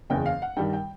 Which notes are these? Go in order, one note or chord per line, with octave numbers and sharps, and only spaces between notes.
F#1 E2 C#3 G5
F5
F#5
G2 D#3 G3 G5
G5